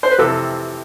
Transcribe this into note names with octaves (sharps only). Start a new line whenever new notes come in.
C5
B4
F2 C3 E3 A4